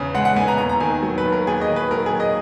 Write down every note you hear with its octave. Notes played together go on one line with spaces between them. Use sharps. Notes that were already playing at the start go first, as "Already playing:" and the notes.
Already playing: E2 C#3 B3
G#3 F#5
F#5
B3 G#5
A#5
D#2 A#5
A#5
D#3 G#5
F#3
B4
D#2
A#4
D#2 G#4
D#5
D#3
B4
F#3 A#4
G#4
D#2
D#5